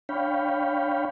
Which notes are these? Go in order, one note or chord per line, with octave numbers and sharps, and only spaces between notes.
D4 C#5 F5 G5 B5